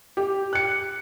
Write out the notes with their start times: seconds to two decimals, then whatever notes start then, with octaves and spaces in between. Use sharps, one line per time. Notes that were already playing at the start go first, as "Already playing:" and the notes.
0.17 G4
0.53 F#6 C#7